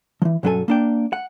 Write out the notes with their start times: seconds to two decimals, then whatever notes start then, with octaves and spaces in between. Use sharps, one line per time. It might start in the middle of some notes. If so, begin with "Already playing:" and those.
0.22 E3 F3
0.43 B1 G2 F#3 C#4 A4 G#5
0.68 A#3 D4 G5
1.13 F#5